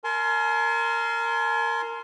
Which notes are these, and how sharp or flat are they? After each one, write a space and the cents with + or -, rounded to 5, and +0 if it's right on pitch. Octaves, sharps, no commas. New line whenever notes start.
A#4 -15 G#5 +40 C6 +0